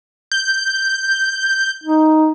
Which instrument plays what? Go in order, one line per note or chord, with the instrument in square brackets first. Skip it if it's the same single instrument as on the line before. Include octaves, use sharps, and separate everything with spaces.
[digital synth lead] G6
[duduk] D#4